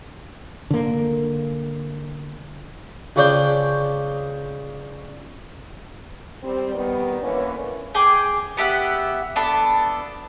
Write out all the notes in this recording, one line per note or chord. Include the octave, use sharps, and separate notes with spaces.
D3 A#3
C#2 C#3 C#4 D4 C5 G5
G3 C4
D#3 G3 B3
D3 E3 A#3 C#4 B4 C#5
G#4 G5 D6
B3 G4 E5 F#5
B3 D4 A4 B5